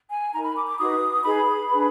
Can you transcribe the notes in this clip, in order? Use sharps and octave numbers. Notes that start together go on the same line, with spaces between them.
G#5
D#4 A#5
A#4
B5
D6
D6
D#4 F#4 B4 D#6
D#4 G#4 B4 B5
D4 G#4 B4